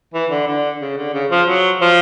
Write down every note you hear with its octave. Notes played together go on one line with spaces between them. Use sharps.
E3
D3
D3
C#3
D3
C#3
F3
F#3
F3